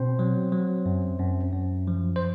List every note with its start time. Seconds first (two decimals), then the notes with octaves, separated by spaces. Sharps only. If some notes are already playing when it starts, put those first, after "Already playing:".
Already playing: B2 C4 C5
0.19 F#3
0.52 F#3
0.86 F#2
1.20 F#2
1.53 F#2
1.88 F3
2.16 C5